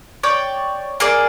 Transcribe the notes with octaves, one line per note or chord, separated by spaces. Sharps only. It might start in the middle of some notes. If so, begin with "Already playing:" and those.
C#5 D5 G5
A#3 G#4 D5